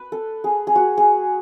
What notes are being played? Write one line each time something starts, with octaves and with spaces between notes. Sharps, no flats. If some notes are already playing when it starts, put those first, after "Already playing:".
Already playing: B4
A4
G#4
G#4
F#4
G#4